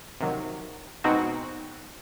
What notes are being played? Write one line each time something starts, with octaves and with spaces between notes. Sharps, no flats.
C3 D#3 F#3
B2 G#3 C4 D#4 F#4